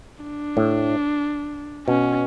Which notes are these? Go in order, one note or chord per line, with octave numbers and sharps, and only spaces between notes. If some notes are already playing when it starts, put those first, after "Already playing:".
D4
A2
B2 C#4